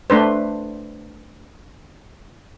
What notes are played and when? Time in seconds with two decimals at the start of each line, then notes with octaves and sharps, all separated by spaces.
0.10 A3 D4 B4 C5